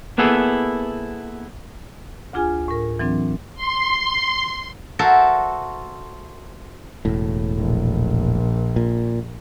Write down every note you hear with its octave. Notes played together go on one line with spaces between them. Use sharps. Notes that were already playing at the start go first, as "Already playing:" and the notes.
A#3 B3 E4 G#4 A4
D2 D4 F4 G#4 G#5 F6
A2 A#4
E3 F#3 C4 D4
C6
F#4 A4 A#4 C5 E5
E1 A2
A#1
A#2